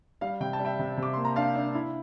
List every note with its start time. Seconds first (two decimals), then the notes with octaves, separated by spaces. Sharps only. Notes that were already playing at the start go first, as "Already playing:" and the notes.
0.21 G3 F5
0.40 C3 G5
0.53 A5
0.59 G3
0.65 E5 G5
0.79 C3
0.97 C3
1.03 D6
1.13 A#3 C6
1.25 A#5
1.36 D4 F5 A5
1.55 D4
1.75 E4